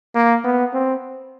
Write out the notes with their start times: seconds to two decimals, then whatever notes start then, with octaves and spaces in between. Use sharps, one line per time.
0.15 A#3
0.44 B3
0.74 C4